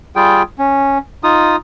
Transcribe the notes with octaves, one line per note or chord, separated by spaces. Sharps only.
G3 F4 G#4 G5
C#4
D#4 F4 D#6